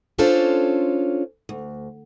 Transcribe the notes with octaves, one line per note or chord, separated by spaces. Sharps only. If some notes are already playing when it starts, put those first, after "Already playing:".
C#4 D4 F4 A4 C5 C#5
D2